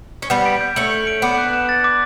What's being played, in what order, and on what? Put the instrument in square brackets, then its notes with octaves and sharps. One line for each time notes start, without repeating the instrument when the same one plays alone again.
[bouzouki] C#4
[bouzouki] G3 B3 [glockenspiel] G6
[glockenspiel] D7
G6
[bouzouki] A3 C#4 [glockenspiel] F#7
[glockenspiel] G6
D7
[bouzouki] B3 D4 [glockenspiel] D6
[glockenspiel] F#6
E7
A6
D6